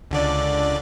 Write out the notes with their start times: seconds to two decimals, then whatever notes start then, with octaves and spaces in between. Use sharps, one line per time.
0.11 C#2 D3 D5